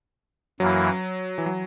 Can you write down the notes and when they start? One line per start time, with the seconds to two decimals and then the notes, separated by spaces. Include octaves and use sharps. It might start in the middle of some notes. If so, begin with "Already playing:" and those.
0.60 F#2 E3 F#3 A#3 E4
1.38 E3
1.46 F#3